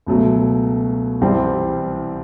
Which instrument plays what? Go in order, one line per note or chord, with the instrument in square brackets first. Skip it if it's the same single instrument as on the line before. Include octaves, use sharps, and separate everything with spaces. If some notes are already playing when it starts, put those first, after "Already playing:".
[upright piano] C#2 B2 F#3 A3
C2 C3 E3 G3 C4